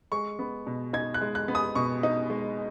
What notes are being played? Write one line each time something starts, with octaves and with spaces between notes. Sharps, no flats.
G#3 C#6
B3
B2
D#4 G#6
F#6
G#3
F#6
B3
D#6
B2 C#6
D#4
G#3